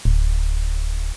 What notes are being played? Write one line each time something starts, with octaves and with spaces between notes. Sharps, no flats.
D1